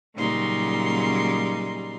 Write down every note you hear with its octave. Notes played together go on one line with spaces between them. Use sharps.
A#2 C#3 F#3 G3 D#4 C6